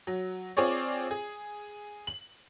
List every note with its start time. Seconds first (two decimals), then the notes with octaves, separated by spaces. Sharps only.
0.07 F#3
0.57 C4 F4 G#4 C#5 D5
1.11 G#4
2.07 F#7